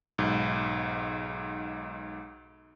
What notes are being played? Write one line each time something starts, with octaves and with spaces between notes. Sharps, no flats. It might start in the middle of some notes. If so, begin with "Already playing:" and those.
B1 G#2